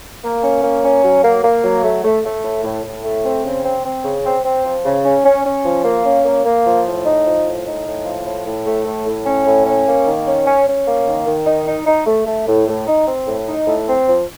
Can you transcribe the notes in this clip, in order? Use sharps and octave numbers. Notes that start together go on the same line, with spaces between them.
A#3
C#4
A#3
C#4
F#3
A#3
A#3
F#3
A3
A3
A3
A2
A2
A2
A3
C4
C#3
C4
C4
C#3
C4
C4
F3
C#3
C#4
C#4
C#4
F3
A#3
C#4
A#3
A#3
F3
A2
D#4
F3
A2
D#4
A2
F3
A2
A2
A3
A2
A2
C#4
A2
C#4
A#3
D#3
C#4
C#4
C#4
A#3
D#3
D#3
D#4
D#4
D#4
A3
A3
A2
A2
D#4
C4
A2
D#4
A2
C4
F3